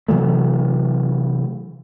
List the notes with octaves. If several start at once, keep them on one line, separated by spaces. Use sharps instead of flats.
C3 E3 F#3 A3